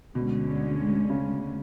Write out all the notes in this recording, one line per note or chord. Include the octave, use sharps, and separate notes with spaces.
D2 B2 D3 G#3 C#4
C#3